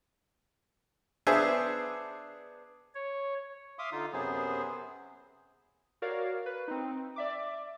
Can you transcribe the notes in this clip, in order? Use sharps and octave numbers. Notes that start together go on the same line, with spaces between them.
B3 D4 G#4 C5 E5 G#5
C#5
E5 F5 C6 D6 D#6
D3 D#4 F4
F#2 C3 F#3 B3 G#4 C5
F#4 A#4 C#5 D5 F5
B4
C4 D#4
D5 E5 D6